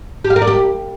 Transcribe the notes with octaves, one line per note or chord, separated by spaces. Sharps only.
G4
F5
A#4
D5
G4